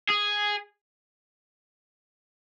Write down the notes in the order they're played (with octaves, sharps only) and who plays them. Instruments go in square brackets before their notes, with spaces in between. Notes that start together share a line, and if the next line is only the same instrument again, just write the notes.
[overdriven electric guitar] G#4